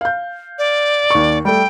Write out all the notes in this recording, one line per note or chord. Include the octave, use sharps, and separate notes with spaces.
F5 G6
D5
D#2 C#6
G3 A3 G5